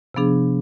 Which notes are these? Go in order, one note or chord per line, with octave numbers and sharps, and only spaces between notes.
C3 F3 B3 D4 G#4